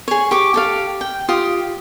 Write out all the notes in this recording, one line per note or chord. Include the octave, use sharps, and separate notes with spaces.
G#4 C#5
G4 C#6 D6
G4 A4 F5
G5
F4 G4 D#6